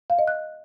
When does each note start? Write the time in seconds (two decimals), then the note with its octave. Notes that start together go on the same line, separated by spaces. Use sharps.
0.10 F5
0.19 D#5
0.28 F#6